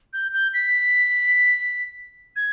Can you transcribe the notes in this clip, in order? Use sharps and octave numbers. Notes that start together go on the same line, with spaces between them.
G6
G6
B6
G#6